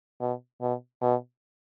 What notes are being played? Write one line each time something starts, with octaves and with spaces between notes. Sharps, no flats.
B2
B2
B2